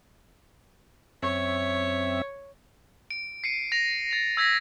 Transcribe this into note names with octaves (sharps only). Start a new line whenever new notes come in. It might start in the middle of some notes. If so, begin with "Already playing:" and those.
F#2 C4 C#5 E5
D7
C7 C#7 D#7
A#6 F7
A6 F7
E6 G#6 A#6 B6